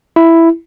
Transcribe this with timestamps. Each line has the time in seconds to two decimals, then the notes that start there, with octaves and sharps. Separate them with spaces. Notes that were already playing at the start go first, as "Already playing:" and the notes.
0.16 E4